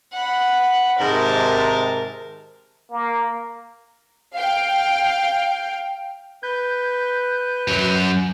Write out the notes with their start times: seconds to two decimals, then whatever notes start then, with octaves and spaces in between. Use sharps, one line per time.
0.14 F#5 B5
1.00 G#2 C3 D#3 A#4 A5
2.91 A#3
4.35 F5 G5
6.43 B4 G6
7.68 F#2 F#3